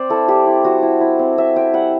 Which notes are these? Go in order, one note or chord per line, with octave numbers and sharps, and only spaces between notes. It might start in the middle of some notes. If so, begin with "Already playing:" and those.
Already playing: C4 C5 D5
E4 A4
G3 G4
E4
G3 F#4
E4
E4
C4
C4 E5
C4 G5
G3 F#5